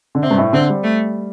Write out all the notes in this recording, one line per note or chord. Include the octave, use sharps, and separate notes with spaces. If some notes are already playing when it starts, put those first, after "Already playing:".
D3
C3 C4
G2
A2
D3 C4
G3
A3